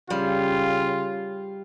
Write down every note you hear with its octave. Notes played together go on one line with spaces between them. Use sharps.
C#3 G3 F4